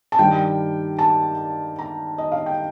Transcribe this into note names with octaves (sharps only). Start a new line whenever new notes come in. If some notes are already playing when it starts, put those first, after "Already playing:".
A5
G2 D#3 G3 G5
A5
A#5
D#5
F5
G5